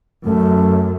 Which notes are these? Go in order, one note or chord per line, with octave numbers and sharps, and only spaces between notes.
F#2 A3